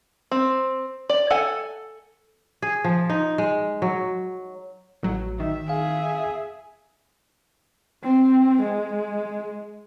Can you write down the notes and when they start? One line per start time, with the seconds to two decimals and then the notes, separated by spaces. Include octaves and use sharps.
0.31 C4
1.09 D5
1.30 A4 F#5 G#5
2.62 G#4
2.84 F3
3.10 D#4
3.38 G#3
3.82 F#3
5.03 A1 F#3
5.40 D#3 E5
5.69 G#4 F5
8.03 C4
8.62 G#3